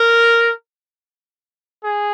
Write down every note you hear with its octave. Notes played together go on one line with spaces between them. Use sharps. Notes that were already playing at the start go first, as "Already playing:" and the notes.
Already playing: A#4
G#4